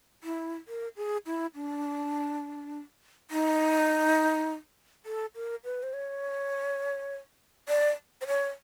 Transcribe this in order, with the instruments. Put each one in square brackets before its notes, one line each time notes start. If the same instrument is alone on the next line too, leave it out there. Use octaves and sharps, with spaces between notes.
[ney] E4
A#4
G#4
E4
D4
D#4
A4
A#4
B4
C5
C#5
D5
C5
C#5